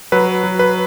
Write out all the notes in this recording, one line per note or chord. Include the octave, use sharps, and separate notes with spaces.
F#3 B4
F#3
B4